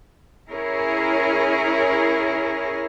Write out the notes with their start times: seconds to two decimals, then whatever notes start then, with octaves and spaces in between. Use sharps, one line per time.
0.50 C#4 E4 G#4 A#4 C#5